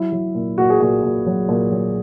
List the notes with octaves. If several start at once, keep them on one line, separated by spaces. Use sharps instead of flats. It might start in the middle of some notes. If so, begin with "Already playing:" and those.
Already playing: F#3 E4
F#3
A#2
A#2 F#4
G#4
A#2 F#4
A#2
F#3
A#2
F#3